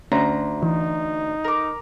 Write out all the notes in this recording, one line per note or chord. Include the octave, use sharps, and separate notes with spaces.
D2 C#4 A#5
E3 D#4
A#4 D6